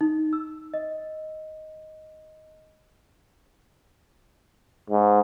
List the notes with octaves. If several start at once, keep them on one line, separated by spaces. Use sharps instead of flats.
D#4
E6
D#5
G#2